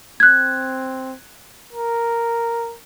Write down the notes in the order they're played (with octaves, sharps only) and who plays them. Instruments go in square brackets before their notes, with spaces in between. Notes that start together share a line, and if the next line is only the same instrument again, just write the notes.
[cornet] C4 [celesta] F#6 G#6
[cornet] A#4